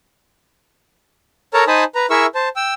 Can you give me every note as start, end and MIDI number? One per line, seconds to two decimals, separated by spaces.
1.54 1.64 69
1.54 1.64 70
1.54 1.64 73
1.54 1.64 81
1.54 1.64 82
1.67 1.84 63
1.67 1.84 72
1.67 1.84 80
1.67 1.84 81
1.67 1.84 83
1.67 1.84 87
1.95 2.06 71
1.95 2.06 82
2.10 2.26 64
2.10 2.26 68
2.10 2.26 70
2.10 2.26 76
2.10 2.26 85
2.10 2.26 88
2.35 2.49 72
2.35 2.49 81
2.56 2.74 79
2.56 2.74 88